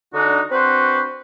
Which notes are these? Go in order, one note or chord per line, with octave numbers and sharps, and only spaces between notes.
D3 D4 D#4 F#4
C4 D4 F#4 B4 C5